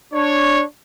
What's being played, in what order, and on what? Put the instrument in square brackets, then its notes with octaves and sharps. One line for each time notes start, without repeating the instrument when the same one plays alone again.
[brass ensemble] D4 C#5